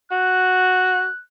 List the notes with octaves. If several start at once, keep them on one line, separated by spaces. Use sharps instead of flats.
F#4 F#6